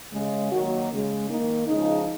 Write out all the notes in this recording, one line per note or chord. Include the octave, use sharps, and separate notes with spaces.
C#3 G#3
D#3 F#3 A#3 F#4
C#3 G#3
D#3 A#3 D#4
C#3 F3 G#3 D#4